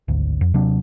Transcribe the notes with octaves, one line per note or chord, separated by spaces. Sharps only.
G#1 D2
F2
D#2 C3 F#3 D4